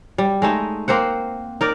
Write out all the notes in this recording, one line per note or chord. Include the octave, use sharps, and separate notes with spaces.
G3
G#3 A3 D#4
A#3 C4 C5 F#5
D#4 A#4 D5